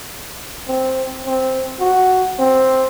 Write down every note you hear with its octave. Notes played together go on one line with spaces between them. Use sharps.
C4
C4
F#4
C4